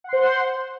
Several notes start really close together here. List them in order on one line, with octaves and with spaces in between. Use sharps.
F#5 C6 C5